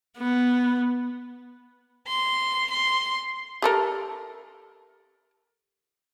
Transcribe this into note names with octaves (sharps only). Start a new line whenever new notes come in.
B3
C6
C6
G4 A4 A#4